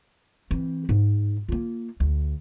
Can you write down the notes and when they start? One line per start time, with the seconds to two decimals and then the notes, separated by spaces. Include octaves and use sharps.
0.51 E3 C4
0.89 G#2
1.48 A#3 F4
2.00 D2